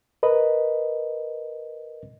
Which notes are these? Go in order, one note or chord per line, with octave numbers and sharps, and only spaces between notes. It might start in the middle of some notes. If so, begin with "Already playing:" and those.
A#4 B4 D#5